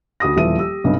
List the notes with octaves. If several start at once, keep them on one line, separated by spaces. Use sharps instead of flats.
D2 F#4 D#6 A#6
D#1 E2 F3 B4 E5 D#7
G4 E6
B1 G2 C3 D#5